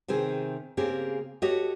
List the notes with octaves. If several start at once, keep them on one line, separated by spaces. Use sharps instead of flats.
C3 D#3 C4 G#4
C#3 A#3 C4 G4 G#4
F#4 G4 A4 C#5 D#5